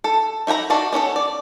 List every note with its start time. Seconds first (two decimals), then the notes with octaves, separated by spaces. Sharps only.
0.04 A4
0.47 D#4 E5 G5 A#5 B5
0.70 D4 D#4 F#4 A5
0.93 B3 C#4 F#4 A4
1.16 D5